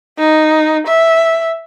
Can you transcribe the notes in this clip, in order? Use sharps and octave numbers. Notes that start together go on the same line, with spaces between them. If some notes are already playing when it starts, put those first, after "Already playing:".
D#4
E5